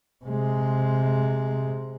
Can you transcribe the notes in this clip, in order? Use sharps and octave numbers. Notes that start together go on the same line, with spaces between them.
C3 G#3